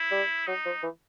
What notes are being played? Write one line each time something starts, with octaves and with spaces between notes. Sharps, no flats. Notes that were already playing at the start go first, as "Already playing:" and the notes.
Already playing: E4
G3
F#3 D#4
F3
E3